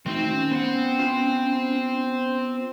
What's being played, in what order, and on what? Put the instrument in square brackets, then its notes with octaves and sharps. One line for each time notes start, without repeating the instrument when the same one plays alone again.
[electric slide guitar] D#3 A3 F#4 [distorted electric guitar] C4 [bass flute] D#4
[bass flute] C#4
[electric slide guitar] B3 C5 F#5
B3 F4